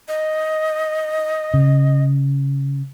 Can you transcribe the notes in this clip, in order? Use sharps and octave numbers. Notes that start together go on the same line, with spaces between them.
D#5
C#3